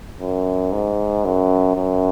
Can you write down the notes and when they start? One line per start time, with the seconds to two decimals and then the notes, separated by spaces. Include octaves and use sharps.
0.20 F#2
0.72 G#2
1.25 F#2
1.76 F#2